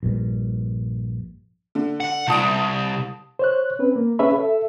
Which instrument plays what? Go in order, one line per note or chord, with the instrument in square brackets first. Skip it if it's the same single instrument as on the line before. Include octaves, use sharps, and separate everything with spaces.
[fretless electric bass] A#1 G2
[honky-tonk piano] D3
[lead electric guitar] F#5
[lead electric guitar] C2 [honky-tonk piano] A5 D#6 D7
[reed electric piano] C5 C#5 F#6
C4 C#4 B4
A#3
C#4 G#4 B4 C#5 E5 B5
A4 E5